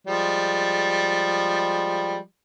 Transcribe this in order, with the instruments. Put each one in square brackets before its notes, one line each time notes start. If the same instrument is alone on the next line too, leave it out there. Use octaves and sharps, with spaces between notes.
[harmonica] F3 G3 G#3